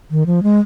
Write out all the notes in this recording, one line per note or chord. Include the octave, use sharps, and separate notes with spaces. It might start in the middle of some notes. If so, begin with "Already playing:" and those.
D#3
F3
G#3